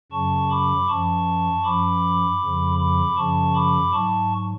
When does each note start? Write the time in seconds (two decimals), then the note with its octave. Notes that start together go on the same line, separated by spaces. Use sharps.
0.12 F#2 C#3 F#3 A5 C#6
0.51 B5 D6
0.88 F#2 F3 A5 C#6
1.64 F#2 F3 B5 D6
2.41 F2 C#3 F3
2.78 B5 D6
3.17 F#2 C#3 F3 A5 C#6
3.55 B5 D6
3.93 G#2 F#3 A5 C#6